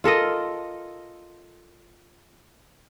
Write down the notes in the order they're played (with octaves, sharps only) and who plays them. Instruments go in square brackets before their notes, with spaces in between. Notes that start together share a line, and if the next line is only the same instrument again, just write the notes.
[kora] F4 A4 A#4 D#5